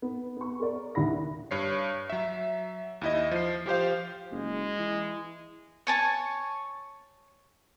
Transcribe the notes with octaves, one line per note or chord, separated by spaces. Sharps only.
B3
B3 C#6
G#4 A#4 D5
D#2 D3 E4 G4 B5 A#6
G2 C#5 C7
F#3 E5
D#2 E4 D#5
F3 C7
F3 G4 C5 F5
F#1 G#3
E3
C#5 G#5 A5 C#6